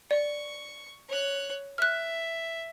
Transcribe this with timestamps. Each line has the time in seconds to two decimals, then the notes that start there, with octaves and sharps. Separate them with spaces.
0.11 D5 C#6
1.09 C#5 F#6
1.78 E5 F6 F#6